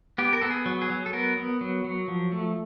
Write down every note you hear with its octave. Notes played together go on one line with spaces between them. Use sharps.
B3 G4
A#4
B3 A4
G#4
F#3
G#4
F#3
A4
B3 A#4
B3
F#3
F#3
F3
A3